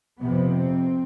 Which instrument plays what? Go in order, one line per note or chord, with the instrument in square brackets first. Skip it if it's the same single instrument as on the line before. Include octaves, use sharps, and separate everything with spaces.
[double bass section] F2 C3 B3
C4